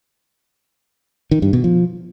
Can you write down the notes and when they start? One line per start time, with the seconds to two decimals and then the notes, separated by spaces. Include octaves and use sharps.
1.31 D#3
1.42 G2
1.53 B2
1.64 F3